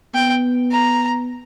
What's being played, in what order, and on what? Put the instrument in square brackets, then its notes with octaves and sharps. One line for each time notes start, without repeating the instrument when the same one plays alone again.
[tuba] B3 [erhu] G5
[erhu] A#5